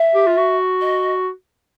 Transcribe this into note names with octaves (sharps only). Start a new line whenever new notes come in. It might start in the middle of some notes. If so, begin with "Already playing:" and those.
Already playing: E5
G4
F4
F#4
D#5